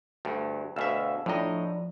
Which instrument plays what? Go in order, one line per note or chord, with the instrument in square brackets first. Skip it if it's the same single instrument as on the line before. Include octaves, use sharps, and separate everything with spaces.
[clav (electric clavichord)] D2 G2
[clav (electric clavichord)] D2 B2 E5 [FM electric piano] F5 E6
[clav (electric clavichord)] A2 D#5 [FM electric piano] F3 D4 A#5